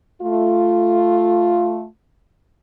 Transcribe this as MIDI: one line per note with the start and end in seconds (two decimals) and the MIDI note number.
0.22 1.85 57
0.22 1.85 65